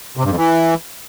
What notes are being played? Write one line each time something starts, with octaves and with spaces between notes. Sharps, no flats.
C3
G2
F2
E3